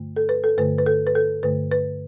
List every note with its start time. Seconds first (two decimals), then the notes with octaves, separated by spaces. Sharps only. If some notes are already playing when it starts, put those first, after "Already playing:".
Already playing: G2 D3 A3
0.16 A4
0.29 B4
0.44 A4
0.58 G2 D3 A3 B4
0.78 B4
0.86 A4
1.07 B4
1.15 A4
1.43 G2 D3 A3 B4
1.72 B4